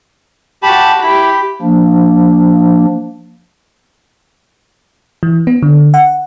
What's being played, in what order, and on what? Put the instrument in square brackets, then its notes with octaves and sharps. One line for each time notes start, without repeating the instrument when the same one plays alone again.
[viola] F#4 A5 [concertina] G4 B5
[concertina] E4 [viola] G4 B5
[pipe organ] F3 A#3 D4
[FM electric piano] E3
B3
D3
F#5